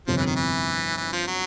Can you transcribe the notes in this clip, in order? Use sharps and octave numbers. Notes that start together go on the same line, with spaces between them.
G1 F2 C3 F3
E3
D#3
E3
E3
F3
F#3